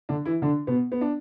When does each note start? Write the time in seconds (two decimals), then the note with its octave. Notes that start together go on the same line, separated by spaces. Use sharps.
0.09 D3 D4
0.26 E3 E4
0.42 D3 D4
0.67 B2 B3
0.92 B3
1.01 D4